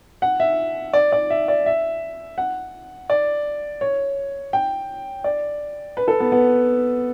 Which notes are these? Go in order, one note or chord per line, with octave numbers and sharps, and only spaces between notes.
F#5
E5
D5
D5
E5
D5
E5
F#5
D5
C#5
G5
D5
B4
A4
B3
B3